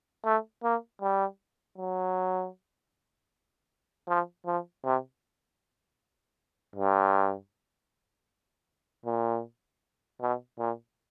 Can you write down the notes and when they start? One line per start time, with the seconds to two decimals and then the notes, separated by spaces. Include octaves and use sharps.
0.25 A3
0.64 A#3
1.02 G3
1.78 F#3
4.08 F3
4.46 F3
4.84 C3
6.76 G2
9.06 A#2
10.21 B2
10.59 A#2